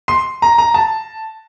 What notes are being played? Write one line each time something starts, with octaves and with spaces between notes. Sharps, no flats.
C6
A#5
A#5
A5